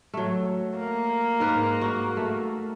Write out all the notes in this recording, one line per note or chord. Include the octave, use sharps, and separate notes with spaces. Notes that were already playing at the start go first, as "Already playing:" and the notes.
F#3 A3
A#3
G#2 A#4 B4
F#4
A3